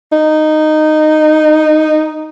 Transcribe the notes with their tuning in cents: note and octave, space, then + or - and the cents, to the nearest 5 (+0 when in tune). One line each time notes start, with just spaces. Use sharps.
D#4 -10